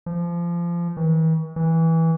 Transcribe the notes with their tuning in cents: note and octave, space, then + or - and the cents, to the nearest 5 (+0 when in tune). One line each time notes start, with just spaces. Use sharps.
F3 -25
E3 -45
E3 -15